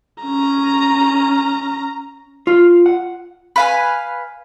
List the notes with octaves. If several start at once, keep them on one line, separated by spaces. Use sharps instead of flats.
C#4 A#5
F4
F#5
B4 F5 G#5